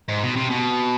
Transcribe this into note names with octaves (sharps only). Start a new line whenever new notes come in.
G#2
B2
C3
B2